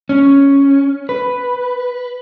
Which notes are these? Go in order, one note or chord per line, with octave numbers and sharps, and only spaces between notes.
C#4
B4